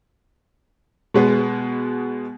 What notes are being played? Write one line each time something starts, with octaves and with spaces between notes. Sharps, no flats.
B2 G#3 B3